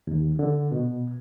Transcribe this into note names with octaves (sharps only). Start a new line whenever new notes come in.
D#2
D3
B2